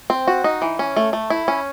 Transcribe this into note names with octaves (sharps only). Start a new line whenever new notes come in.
C4
F#4
D#4
E3
C#4
A3
A3
E4
C#4